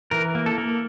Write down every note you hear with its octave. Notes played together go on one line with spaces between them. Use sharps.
E3 A#4
A#3
A4
A#3